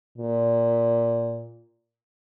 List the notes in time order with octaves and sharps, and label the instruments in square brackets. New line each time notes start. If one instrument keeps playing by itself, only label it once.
[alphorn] A#2